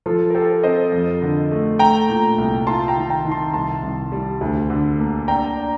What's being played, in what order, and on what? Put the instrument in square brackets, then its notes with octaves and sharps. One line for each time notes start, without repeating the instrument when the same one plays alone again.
[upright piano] F3 [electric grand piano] F4 A4
[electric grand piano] A#4
[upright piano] G4 [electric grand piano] A4 C5
[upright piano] C4 [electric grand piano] C5 D#5
[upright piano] F2
D3
A3
[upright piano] A3 [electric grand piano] G5 A#5
[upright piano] A#2
C2
[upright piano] F4 [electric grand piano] A5 C6
[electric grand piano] G5 A#5
[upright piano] D#3
[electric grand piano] G5 A#5
[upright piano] D#3
[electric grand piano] A5 C6
[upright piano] C2 [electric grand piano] A5 C6
[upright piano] C2
G3
D2
D3
A#3
[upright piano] D4 [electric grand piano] G5 A#5
[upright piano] D4